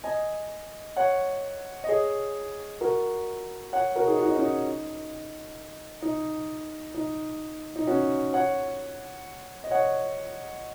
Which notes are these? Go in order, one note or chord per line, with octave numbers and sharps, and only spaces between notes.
D#5 G#5
C#5 F#5
D#5
G#4 C#5
F#4 A#4
C#5 F#5
F#4 A#4
D#4 G#4
F#4
D#4
C#4
D#4
D#4
D#4
D#4
C#4 F#4
C#5 F#5
D#5
C#5 F#5